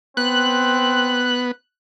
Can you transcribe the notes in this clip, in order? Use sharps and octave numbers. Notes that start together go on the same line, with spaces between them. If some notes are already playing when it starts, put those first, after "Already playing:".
B3 C4 F#6